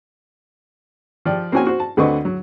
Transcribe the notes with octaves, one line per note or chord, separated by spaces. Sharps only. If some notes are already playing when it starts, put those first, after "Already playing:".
F3 G4 D5
A#3 C4 C#4 F#4 C#5 G#5
F#4 C5
A5
D2 D3 C4 B4 D#5 C#6
F#3